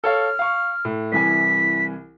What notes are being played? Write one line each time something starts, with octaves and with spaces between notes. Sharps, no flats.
A4 C#5 F5 F6
F5 C#6
A2
C2 E3 G#5 B6